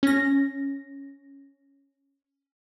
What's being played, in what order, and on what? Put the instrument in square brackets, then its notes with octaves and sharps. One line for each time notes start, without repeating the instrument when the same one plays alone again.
[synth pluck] C#4 A#6